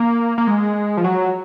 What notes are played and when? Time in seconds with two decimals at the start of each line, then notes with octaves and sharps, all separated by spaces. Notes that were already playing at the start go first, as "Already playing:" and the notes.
Already playing: A#3
0.38 A#3
0.47 G#3
0.97 F3
1.04 F#3